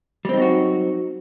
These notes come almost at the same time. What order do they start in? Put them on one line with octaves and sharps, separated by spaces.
G3 C4 D#4 F#3 F#4